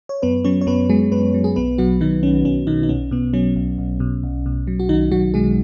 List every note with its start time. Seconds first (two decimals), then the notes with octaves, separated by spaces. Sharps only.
0.09 C#5
0.22 F#2 B3 B4
0.44 F#3 C#4 C#5
0.61 C#5
0.67 F#2 B3 B4
0.89 F#3 G#3 G#4
1.12 F#2 B3 B4
1.34 F#3
1.44 G#4
1.56 B1 B3 B4
1.78 B2 F#3 F#4
2.01 D#3 F#3 D#4
2.23 B1 C#4
2.45 B1 C#4
2.67 B2 D#3 D#4
2.83 D#4
2.89 B1 C#4
3.11 B2 B3
3.34 F#3 C#4
3.56 B1
3.78 B1
4.00 B2
4.23 B1
4.46 B2
4.67 F#3
4.80 F#4
4.89 B1 D#3 D#4
5.11 B1 F#3 F#4
5.34 B2 G#3 G#4